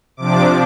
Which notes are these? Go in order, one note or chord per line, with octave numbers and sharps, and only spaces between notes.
C3 F3 D4 D6